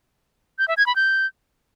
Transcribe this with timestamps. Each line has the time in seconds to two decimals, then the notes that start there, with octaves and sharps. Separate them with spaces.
0.59 G6
0.68 E5
0.77 G#6
0.86 B5
0.96 G6